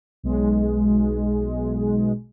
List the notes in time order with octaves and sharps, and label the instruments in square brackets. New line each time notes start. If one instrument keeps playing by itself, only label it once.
[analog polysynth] B1 G#3